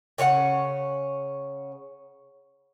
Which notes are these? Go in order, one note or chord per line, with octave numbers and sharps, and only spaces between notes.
C#3 C#4 E4 F#5